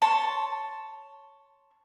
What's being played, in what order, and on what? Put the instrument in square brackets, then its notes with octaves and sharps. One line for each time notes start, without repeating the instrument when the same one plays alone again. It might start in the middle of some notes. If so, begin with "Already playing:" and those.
[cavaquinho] C#5 A5 C6